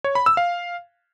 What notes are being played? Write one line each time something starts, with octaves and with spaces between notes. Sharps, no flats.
C#5
B5
E6
F5